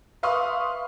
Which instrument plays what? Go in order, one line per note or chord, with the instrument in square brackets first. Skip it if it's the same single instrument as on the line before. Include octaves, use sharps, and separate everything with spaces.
[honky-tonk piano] B4 E5 F5 C6 C#6 D#6